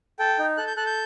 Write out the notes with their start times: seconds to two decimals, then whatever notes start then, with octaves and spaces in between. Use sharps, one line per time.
0.19 A4 G5
0.39 D#4
0.57 A4 F#6
0.67 G6
0.76 A4 F#6
0.86 G6